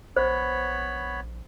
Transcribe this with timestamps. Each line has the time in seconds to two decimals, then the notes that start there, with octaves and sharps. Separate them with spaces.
0.16 A#1 B3 C5 C#5 B5